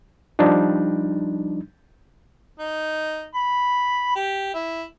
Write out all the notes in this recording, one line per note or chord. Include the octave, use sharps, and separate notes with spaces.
F3 G3 D4 D#4
D#4
B5
G4
E4